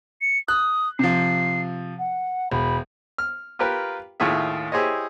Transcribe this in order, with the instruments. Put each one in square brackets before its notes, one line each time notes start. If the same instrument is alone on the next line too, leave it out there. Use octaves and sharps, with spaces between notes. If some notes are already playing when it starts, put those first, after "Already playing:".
[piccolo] C#7
[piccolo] D#6 [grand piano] F#6
[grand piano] C3 F3 [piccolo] C7
[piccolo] F#5
[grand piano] E1 [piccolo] B5
[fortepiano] F6
F4 G4 A#4 B4 G5
D#2 A2 F4 G#4 E5
E4 G4 G#4 C5 C#5 D#5